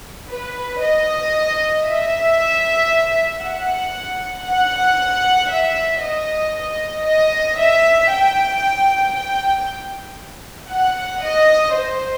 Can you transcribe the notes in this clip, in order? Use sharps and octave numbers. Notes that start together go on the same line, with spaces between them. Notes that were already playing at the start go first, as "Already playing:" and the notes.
B4
D#5
E5
F#5
F#5
E5
D#5
D#5
E5
G5
G5
F#5
D#5
C5